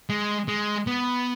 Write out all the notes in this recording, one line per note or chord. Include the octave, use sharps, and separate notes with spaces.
G#3
G#3
B3